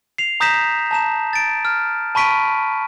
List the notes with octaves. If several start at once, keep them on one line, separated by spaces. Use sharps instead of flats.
C7 F7
A#5 D#6 G6 A#6 B6 E7
A5 A#5 E7
A6 D7
F6
A5 B5 C#6 B6 D7 D#7